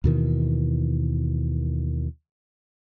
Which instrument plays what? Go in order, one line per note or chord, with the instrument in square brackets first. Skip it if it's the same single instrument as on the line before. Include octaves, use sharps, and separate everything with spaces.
[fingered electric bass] D#2 B2 D#3 E3